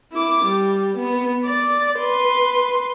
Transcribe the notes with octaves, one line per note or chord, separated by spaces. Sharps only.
E4 D6
G3
B3
D5
B4 C6